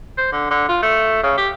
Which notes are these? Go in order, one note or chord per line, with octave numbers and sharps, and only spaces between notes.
C5
D3
D3
F4
A3
C#3
G4